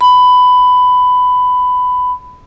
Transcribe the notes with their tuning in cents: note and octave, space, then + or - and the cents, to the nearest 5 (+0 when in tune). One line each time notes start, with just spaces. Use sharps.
B5 +15